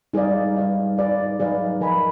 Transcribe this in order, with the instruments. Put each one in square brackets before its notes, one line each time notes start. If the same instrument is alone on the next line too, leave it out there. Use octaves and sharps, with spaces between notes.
[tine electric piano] G3 [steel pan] D#4 G#4 B4 D5 F5
[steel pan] D#4 G#4 B4 D5 F5
D#4 G#4 B4 D5 F5
[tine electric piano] F#3 [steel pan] D#4 G#4 B4 D5 F5
[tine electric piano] F3 [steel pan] A#4 D#5 G#5 B5